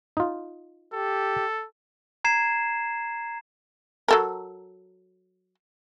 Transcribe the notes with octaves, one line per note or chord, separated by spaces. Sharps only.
D#4 F4
G4 A4
A#5 G#6 C7 E7
F#3 A4 A#4